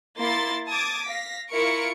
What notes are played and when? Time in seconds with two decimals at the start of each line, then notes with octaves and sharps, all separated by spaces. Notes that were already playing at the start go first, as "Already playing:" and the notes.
0.20 A#3 E4 C6 A6
0.69 A5 D6 D#6 G#6 A6
1.06 F5 A#6 B6
1.51 E4 F4 A#4 C#6 C#7 D7